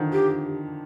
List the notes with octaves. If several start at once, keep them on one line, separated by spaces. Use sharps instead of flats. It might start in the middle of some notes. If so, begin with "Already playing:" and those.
Already playing: D3 D#3 F3
G4